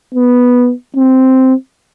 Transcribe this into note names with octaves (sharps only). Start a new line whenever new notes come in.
B3
C4